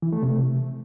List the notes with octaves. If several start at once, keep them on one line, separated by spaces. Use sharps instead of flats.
E3
A3
C3